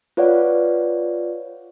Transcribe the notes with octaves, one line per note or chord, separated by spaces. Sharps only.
F4 B4 C#5 D5 F5 F#5